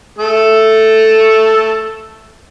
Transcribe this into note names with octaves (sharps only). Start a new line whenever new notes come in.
A3 A4